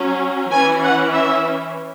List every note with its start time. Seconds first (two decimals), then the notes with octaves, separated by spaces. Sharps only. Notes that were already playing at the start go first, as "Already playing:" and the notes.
Already playing: F#3 C#4
0.51 E3 C#4 G#5
0.83 F#5
1.12 E5